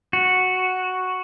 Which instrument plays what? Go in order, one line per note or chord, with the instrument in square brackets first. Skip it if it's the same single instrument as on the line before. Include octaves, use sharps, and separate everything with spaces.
[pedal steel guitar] F#4